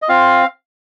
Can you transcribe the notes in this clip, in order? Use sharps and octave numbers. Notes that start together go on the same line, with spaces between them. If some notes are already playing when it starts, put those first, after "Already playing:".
D#5
C4 F4 F5